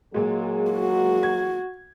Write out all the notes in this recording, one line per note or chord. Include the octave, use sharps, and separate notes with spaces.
A#2 F#3 G#3 A#3 G#4
F#4
G#6